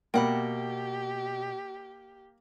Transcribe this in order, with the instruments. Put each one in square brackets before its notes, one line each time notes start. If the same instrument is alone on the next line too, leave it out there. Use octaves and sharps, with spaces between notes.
[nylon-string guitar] B2 F#5 [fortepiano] A#3 [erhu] G4 [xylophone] G5 B5